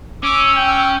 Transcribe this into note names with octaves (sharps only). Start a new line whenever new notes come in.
C#4 D6 E6
G5